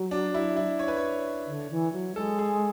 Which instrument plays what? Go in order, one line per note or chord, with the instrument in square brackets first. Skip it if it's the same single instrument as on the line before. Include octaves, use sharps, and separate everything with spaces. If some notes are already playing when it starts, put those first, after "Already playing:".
Already playing: [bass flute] F#3
[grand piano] D4
E4
E4
C#5
B4
C#5
[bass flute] D3
E3
F#3
[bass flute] G#3 [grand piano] A4
[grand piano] G#4